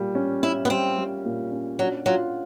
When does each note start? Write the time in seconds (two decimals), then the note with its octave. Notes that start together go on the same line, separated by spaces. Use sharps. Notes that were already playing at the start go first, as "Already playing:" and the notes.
Already playing: A#2 G3
0.15 C#4
0.43 C#4 E4
0.65 B3
0.70 G3 C4
0.98 G3
1.25 A#2
1.52 C#4
1.79 F#3 D4
2.06 F#3 F4